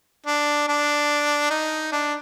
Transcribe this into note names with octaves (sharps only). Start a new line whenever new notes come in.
D4
D4
D#4
D4